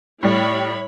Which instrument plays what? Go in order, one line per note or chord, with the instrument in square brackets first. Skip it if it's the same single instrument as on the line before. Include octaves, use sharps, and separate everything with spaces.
[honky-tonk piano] A2 G3 [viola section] E4 C#5 B5